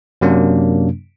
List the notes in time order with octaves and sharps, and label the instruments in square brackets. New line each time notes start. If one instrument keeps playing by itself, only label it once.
[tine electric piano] F#2 C3 F#3 A#3 D4